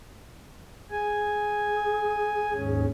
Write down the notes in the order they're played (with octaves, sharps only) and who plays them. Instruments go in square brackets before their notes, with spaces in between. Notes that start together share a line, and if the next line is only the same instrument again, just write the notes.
[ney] G#4 [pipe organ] G#5
[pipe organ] D#2 G#2 C#4